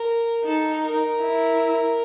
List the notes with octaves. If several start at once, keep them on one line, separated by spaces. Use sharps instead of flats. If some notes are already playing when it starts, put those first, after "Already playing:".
Already playing: A#4
D#4 A4
A#4
E4